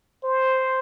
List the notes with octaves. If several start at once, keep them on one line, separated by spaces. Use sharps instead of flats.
C5